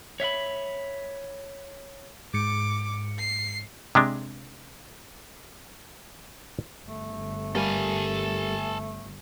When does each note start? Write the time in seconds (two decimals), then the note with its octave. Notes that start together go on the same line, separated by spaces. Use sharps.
0.20 C#5 E5 F5 B5
2.34 G#2 D6 C#7
3.18 C7
3.95 C3 G#3 D4
6.86 G1 A3
7.55 G3 A#3 A4 G#5